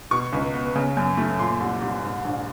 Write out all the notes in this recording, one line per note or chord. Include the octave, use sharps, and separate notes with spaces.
B2 C#6
C#2
B3
C#3
F#2
A3
A#2 C6
C2
C2
G#2
A#1